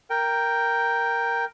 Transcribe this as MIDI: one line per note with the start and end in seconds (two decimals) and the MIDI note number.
0.10 1.45 70
0.10 1.45 79